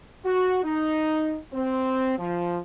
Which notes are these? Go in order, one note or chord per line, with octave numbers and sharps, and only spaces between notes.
F#4
D#4
C4
F3